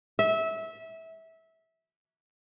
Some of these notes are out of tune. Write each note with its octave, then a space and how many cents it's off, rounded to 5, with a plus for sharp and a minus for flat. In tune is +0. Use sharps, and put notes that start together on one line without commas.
E5 -20